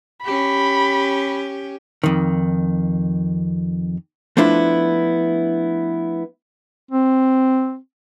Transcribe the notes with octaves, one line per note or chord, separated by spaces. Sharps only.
C#4 G4 B5
F2 D#3
F3 A3 B3 D4 E4 F4
C4